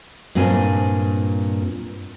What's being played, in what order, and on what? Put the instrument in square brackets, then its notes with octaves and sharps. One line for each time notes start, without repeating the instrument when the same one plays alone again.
[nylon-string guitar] G2 A#2 C4 G#5